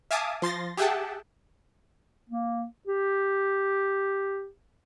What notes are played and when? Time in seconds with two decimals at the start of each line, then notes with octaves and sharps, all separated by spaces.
0.11 E5 F5 G#5 A5 D6 D#6
0.42 F3 C6 A6 A#6
0.77 G4 G#4 E5 F#5 G5 A5
2.30 A#3
2.87 G4